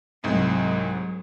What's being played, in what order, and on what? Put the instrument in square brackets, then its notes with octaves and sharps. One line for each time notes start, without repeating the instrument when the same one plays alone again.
[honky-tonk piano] C2 G#2 [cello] F#3 G#3